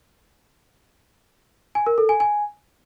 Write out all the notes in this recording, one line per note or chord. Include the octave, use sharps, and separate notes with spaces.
G#5
A#4
A4
G#5
G#5